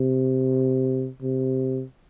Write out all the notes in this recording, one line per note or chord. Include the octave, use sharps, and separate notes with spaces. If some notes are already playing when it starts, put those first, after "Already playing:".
Already playing: C3
C3